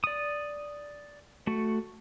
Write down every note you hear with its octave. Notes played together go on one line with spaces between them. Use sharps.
D5 D#6
A3 F#4